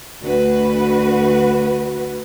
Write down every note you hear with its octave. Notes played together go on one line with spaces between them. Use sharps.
D2 F#4 B4